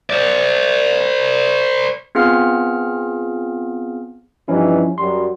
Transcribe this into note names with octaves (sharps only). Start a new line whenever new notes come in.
C5 D5
B3 C4 F4 G#4 F5 F6
G2 E3 F3 C#4 D#4 E4
F#2 F#3 G3 C6